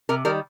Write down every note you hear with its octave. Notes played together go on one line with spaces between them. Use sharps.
C3 A#4
D#3 G3 A#4